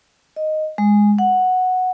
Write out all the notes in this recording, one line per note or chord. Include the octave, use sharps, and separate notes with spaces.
D#5
G#3
F#5